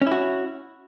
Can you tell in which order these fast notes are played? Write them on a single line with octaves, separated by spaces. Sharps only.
C#4 E4 F#4